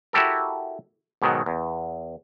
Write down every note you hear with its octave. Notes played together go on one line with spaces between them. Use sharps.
E4 F#4 G4 A4 A#4
G#2 B2 D#3 F#3
E2